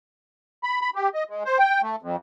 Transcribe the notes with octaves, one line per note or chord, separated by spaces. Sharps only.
B5
B5
G4
D#5
G#3
C5
G5
A3
F2